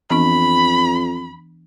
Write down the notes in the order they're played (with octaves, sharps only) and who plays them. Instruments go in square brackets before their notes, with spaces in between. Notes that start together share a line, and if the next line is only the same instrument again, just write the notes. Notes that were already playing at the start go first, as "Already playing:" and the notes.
[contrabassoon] F2 [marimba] E3 B3 D4 [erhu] B5